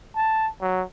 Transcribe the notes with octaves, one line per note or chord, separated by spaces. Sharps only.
A5
F#3